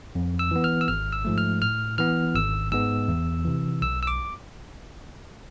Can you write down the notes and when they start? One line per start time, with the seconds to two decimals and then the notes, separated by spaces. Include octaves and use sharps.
0.15 F2
0.39 E6
0.51 E3 B3
0.64 F6
0.81 E6
0.88 G#1 F6
1.13 E6
1.25 G#2 F3 A3
1.38 F6
1.62 A2 F6
1.98 E3 B3 F6
2.36 G#1 E6
2.72 G#2 G#3 B3 E6
3.08 E2
3.45 C3 E3
3.82 B1 E6
4.03 E6
4.07 D6